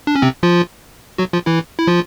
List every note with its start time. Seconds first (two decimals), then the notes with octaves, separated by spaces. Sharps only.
0.07 D4
0.16 C#4
0.22 C3 C4
0.43 F3 F4
1.18 F#3 F#4
1.33 F3 F4
1.46 E3 E4
1.79 E4
1.87 F3 F4